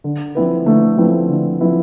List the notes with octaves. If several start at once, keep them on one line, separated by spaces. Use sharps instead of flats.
D3
F3 C4 E4 B4
D3 A3
F3 C4 E4 B4
D3
F3 C4 E4 B4